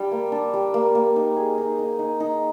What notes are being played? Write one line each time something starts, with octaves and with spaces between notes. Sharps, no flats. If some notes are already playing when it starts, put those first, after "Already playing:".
Already playing: G3 D4 G4
A#3
D4
G3
A#3
A#3
D#4
G#4
D#4
D#4
D#4
D#4